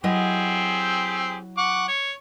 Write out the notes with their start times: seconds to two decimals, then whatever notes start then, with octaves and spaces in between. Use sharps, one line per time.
0.04 F#3 C4 E4 G4 G#4 D#5
1.58 F#5 C#6 D6
1.88 C#5